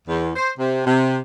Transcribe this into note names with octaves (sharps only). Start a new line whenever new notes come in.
E2
C5
C3
C3